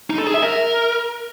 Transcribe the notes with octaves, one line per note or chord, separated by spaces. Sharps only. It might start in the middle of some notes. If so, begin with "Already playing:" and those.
D#4
A4
G#4
E5
A#4